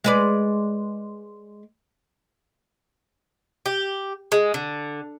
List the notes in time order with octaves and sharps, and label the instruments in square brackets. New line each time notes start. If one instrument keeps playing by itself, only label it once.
[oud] G#3 B4 D5
[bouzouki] G4
G#3
D3